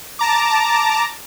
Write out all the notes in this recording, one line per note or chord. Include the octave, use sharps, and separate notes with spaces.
A5 A#5 D6